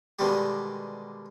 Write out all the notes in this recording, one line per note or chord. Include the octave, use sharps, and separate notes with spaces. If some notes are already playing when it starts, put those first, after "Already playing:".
B2 D3 D#3 G3 G#3 G4